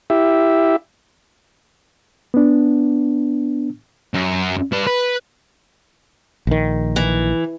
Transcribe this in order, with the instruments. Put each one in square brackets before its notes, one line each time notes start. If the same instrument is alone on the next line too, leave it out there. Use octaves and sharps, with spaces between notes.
[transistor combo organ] E4 G4 E5
[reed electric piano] B3 D4
[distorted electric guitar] F#2
G3 B4
B4
[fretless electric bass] A#1 D#3
[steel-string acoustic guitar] E3